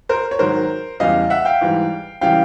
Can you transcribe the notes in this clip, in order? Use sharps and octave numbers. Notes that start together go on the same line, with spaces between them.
A#4 C5
C#5
G#2 D#3 F#3 A#4 C5
E2 C#3 E3 G3 D#5 F5
E5 F#5
F5 G5
G#2 E3 G3
C#3 E3 G3 F5 G5